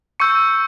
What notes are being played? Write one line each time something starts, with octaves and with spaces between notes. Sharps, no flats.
C#6 E6 G6 C#7